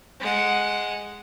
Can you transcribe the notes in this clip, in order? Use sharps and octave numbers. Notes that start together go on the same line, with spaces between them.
G#3 F#5